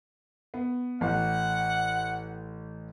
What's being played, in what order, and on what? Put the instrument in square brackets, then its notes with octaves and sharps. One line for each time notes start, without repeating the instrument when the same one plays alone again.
[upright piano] B3
[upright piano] A1 [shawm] F#5